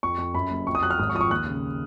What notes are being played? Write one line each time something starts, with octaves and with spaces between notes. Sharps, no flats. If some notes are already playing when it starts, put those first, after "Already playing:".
F2 C#6
F2
F#2 B5
F#1
F2 C#6
D#6
F#3 F#6
F6
G#1 D#6
C#6
F3 D#6
C#6
D#2 F#6
C#3